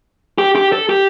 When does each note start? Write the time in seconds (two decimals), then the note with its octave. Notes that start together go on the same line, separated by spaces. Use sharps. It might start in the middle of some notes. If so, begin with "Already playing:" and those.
0.38 G4
0.56 G4
0.72 A4
0.89 G4